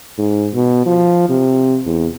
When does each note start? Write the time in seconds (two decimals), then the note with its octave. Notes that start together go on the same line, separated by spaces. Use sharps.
0.18 G#2
0.54 B2
0.86 F3
1.29 C3
1.86 E2